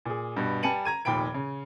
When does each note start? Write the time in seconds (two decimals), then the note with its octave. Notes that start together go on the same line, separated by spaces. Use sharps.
0.05 A#2 G#4
0.37 G2 B2
0.63 G3 G#5 A5 C#7 D#7 F#7
0.85 A#5 G#6 D#7
1.05 F1 D#2 A#2 G5 B5 D7
1.34 C#3